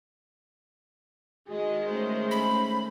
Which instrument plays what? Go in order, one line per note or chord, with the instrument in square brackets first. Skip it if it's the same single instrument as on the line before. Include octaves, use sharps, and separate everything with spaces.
[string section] D#3 G#3 [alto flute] F#4 [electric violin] G#4 D#5
[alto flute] A3 [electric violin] C#4 C5
[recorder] B5